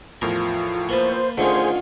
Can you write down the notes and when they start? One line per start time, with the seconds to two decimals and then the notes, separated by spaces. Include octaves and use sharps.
0.22 E2 A2 F3 F4 A#4
0.89 A#3 B4 C5 A5
1.37 D3 D#3 A3 C#4 F4 G#4 C5